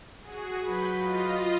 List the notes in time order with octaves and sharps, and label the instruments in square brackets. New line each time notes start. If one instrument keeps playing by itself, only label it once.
[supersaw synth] F#4 G#4
[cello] F#3 B4 [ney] F#4 [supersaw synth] B5 G6
[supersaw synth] F4 D#5